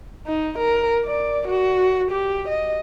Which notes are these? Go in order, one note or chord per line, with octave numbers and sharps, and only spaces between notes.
D#4
A#4
D5
F#4
G4
D#5